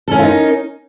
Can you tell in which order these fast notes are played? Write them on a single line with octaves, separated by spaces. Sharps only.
A4 C#4 A#4 F4 D#4